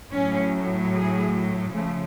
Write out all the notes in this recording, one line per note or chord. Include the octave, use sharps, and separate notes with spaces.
A2 F#3 C#4
G#4
C#3 F3 A3